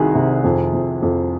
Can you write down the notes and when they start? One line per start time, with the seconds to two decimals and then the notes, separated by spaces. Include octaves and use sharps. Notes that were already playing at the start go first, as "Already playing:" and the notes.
Already playing: C2 D#3 F#4 G#4
0.15 C3
0.44 F2
0.73 F2
1.02 F2